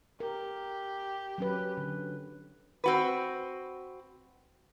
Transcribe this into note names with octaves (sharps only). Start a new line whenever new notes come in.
G4 A#4
F#3 C#4 B4
D3
C4 F#4 B4